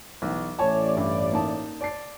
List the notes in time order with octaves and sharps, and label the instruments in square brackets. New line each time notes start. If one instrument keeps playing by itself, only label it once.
[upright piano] B1 E3
[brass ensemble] A1 A2 D5 [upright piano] C#5 G#5 A5
[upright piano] G2
A#3 D#4 A5
D5 A5 C7